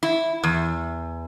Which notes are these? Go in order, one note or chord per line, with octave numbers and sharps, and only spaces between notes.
E4
E2